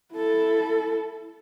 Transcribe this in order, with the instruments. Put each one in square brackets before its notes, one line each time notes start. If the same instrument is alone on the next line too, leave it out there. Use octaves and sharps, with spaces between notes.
[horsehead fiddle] E4 A4